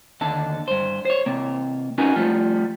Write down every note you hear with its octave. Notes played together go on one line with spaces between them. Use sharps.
D#2 D3 A5
G2 C5
C5 C#5
C3 A#3
C#4 D#4 F#4 A#4 B4 G#5
F3 G3 A3 F4